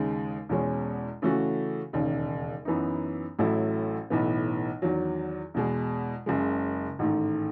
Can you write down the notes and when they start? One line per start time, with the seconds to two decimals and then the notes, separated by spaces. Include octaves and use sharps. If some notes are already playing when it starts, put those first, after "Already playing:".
Already playing: D#2 C#3 G#3 D#4
0.49 E2 B2 G#3 C#4
1.22 C#3 E3 A3 C#4 F#4
1.93 E1 D#2 C#3
2.65 F#2 E3 B3 D#4
3.39 A1 A2 F#3 A3 E4
4.10 B1 A2 E3 B3
4.82 E2 D#3 F#3
5.54 E2 B2 G#3
6.26 F#1 F#2 C#3 G#3
6.99 A1 G#2 D#3 A3